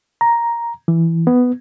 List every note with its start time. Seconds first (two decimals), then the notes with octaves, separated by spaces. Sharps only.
0.21 A#5
0.88 E3
1.27 B3